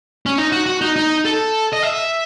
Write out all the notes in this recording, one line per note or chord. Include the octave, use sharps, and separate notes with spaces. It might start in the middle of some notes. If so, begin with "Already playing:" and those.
C#4
D#4
F#4
F#4
D#4
D#4
A4
D#5
E5